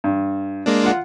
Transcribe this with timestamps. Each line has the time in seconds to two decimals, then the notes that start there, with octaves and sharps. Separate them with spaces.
0.04 G2
0.66 G#3 A#3 D4
0.84 F4 F#5